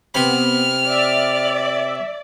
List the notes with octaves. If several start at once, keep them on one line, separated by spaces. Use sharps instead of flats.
C3 B3 B5 F6
D5 E5